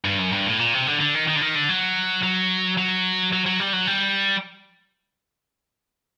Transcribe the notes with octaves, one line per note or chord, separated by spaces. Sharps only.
G2
F#2
G2
A2
A#2
C3
D3
D3
D#3
D#3
D3
D#3
D3
F#3
F#3
F#3
F#3
F#3
G3
F#3
G3